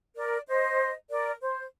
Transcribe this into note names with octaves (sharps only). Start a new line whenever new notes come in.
A#4 D5
C5 D#5
A#4 D5
C5